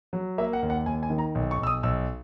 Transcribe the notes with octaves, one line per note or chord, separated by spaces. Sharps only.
F#3
A#3 E5
F#5
D#2
F#5
D#2 G#5
G#5
D#3
A#5
B1
C#6
B1 E6
D#6
B1 E6